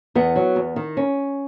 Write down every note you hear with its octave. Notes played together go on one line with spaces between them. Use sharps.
E2 B3
F#3
E2
D#3
C#4